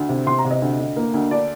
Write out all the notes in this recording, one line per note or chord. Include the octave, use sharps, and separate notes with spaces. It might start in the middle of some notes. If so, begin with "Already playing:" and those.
Already playing: D2
C3
C3 C6
A#5
C3
D#5
D2
D2
A#3
D2
D4 D5